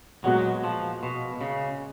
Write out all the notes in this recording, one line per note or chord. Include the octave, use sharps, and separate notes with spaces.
A#2 F#3 G#3 B3 F#4
F3
B2
C#3